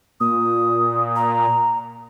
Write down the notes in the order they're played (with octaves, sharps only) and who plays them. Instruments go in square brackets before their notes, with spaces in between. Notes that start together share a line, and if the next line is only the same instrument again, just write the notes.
[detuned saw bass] A#2 [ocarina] D#6
[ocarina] A#5